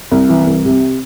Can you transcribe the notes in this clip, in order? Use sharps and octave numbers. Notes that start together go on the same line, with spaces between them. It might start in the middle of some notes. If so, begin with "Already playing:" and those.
C2
E3
C2
C3